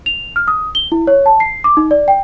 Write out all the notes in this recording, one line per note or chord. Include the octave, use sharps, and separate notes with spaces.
F7
F6
D#6
G7
E4
C#5
A5
C7
D6
D#4
D5
G5